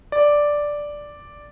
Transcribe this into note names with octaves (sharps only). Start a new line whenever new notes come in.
D5